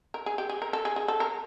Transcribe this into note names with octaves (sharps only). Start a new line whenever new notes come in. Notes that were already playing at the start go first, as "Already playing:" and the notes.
A#4
G#4
G4
G#4
A#4
A4
G#4
G#4
A4
A#4